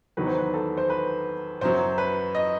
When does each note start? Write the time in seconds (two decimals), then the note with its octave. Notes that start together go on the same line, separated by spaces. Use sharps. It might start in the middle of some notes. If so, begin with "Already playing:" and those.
0.17 E2 D#3 F#3 B4
0.27 C5
0.38 B4
0.54 A4
0.77 C5
0.90 B4
1.61 F#2 F#3 C5
1.98 B4
2.35 D#5